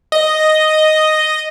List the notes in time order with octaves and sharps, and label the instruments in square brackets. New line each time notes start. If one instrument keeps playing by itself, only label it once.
[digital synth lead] D#5